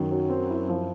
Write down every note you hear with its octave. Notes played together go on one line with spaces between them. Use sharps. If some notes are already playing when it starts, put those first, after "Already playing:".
Already playing: F#2 D#3
F#3
C4
E4
F3